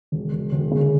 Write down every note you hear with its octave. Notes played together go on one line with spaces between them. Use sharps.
E1
E1
E1 D3
C#3